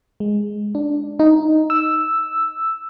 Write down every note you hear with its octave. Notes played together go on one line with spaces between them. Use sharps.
G#3
D4
D#4
E6